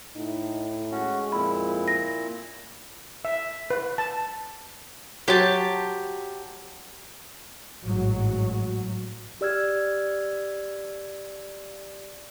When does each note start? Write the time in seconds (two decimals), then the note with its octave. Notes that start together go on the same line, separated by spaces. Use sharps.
0.16 A2 D#4
0.91 G#3 C#4 F#4
1.32 F2 A#2 E4 B5
1.88 A#6
3.25 E5
3.70 B4
3.98 A5
5.28 F#3 G4 C5 C#5 A5
7.86 A1 G#2 F#3
9.41 G4 D5 E6 F6 G#6